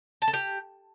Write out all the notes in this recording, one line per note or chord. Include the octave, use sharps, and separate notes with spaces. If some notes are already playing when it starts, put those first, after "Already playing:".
A5
A4
G4